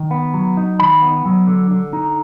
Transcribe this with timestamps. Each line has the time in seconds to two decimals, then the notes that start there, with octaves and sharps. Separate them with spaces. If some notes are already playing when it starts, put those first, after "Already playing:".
Already playing: D#3
0.11 B3
0.34 F#3
0.57 D#4
0.79 D#3 B5
1.02 B3
1.25 F#3
1.47 D3
1.71 D3
1.93 D#4